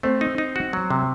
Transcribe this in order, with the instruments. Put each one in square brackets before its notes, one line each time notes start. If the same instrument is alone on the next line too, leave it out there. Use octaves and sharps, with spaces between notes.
[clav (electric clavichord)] A3 [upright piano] C4
[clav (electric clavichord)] D#4
D#4
F#4
F#3
C3